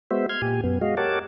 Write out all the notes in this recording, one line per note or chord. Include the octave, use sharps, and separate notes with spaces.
G#3 B3 F#4 C5 E5
C6 F6 G#6
A#2 G4 G#5
F#2 B3
G#3 F#4 D#5 F5
G4 A#4 C#5 F#5 A5 D6